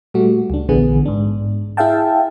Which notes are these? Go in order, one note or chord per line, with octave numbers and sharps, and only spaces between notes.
A#2 G3 A3 F#4
C#2 D4
A#1 D3 E3 B3 G#4
G#2 D4
E4 G#4 E5 F5 G5 A5